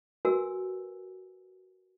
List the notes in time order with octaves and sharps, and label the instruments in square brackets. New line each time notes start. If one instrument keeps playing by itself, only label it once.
[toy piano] F#4 A#4 B4 G#5 E6